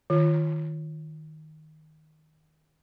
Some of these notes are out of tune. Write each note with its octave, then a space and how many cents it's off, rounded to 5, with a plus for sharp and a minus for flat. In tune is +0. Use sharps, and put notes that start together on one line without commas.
D#3 +0 F4 -10